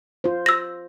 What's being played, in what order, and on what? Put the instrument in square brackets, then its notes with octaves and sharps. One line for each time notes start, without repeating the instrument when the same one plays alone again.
[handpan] F4 C5
[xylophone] E6 A#6